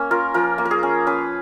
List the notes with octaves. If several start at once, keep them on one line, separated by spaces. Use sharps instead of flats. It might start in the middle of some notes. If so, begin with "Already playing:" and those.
Already playing: A#3 C#4
F4 A#4
F3 A#4
A#3
A#4
G#4
C#4
C#4 B4